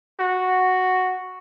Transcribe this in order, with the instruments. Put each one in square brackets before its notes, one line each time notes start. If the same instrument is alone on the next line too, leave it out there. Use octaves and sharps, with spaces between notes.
[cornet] F#4